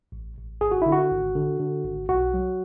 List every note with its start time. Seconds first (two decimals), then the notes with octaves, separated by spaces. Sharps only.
0.12 A1
0.37 A1
0.61 G#1 G#4
0.71 F#4
0.82 D3 E4
0.92 F#4
1.11 G#1
1.35 D3
1.60 D3
1.85 G#1
2.09 B1 F#4
2.34 F#3